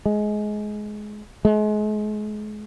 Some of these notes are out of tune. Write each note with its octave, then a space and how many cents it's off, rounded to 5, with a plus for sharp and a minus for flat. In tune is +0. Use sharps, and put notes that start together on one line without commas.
G#3 +20
G#3 +35